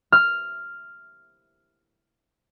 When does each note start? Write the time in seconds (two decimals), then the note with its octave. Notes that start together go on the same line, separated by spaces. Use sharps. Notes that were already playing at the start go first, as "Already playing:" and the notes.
0.12 F6